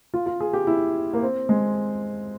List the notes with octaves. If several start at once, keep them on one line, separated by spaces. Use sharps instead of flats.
F4
F4
G#4
G4
E4
A#3
C4
G#3